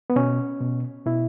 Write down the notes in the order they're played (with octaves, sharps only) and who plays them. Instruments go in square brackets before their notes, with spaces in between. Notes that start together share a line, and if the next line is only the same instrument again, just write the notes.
[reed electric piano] B3
B2 C#4
B2
B2 E4